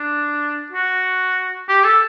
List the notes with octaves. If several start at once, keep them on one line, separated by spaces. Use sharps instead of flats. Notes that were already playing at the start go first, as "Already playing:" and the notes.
Already playing: D4
F#4
G4
A4